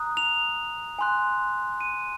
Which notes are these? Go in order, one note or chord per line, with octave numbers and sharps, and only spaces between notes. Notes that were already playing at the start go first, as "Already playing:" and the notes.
Already playing: A#5 D#6 F#6
F7
G#5 C6 F#6
D#7